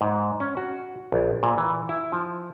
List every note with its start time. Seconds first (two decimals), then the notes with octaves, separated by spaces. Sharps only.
0.01 G#2
0.40 C#4
0.57 F#4
1.12 A#1
1.43 A#2
1.58 E3
1.89 E4
2.12 F3